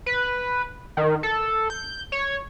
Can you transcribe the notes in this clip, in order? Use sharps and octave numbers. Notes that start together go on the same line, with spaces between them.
B4
D#3
A4
G6
C#5